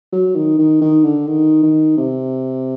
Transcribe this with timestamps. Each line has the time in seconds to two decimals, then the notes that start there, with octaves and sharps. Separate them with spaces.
0.13 F#3
0.35 D#3
0.58 D#3
0.81 D#3
1.04 D3
1.27 D#3
1.63 D#3
1.97 C3